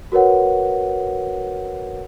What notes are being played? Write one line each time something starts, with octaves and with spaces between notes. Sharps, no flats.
F#4 A#4 B4 C#5 F#5